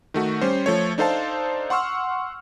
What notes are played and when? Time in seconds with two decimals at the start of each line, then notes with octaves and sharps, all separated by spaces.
0.14 D#3 A3 F#4
0.41 G3 C#4 C5
0.66 F3 A3 C#5
0.98 D4 D#4 A4 C5 F5 A5
1.70 F#5 C6 C#6 E6 F6